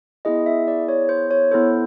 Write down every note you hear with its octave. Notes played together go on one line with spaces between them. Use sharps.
B3 E4 G#4 D#5
E5
D5
C#5
C5
C#5
B3 E4 A4 C5